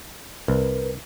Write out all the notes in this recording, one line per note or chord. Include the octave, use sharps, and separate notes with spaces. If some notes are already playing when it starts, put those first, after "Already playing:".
C2 A#4 B4